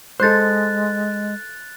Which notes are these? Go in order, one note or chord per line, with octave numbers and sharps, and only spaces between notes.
G#3 A4 C5 F#6 A6